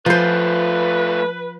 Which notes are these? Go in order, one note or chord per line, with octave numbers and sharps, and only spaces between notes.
F3 A3 F4 B4 C5